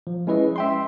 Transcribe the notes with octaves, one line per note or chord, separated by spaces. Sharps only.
F3
G#3 C#4 E4 B4 D#5
E5 G5 C6